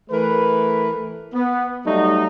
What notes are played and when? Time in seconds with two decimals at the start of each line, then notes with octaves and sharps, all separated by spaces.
0.10 E3 A3 A#4 B4
1.34 B3
1.86 F#3 G3 A3 D#4